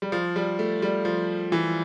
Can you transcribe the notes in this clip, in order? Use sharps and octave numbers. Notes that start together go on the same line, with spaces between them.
G3
F3
G3
A3
G3
F3
E3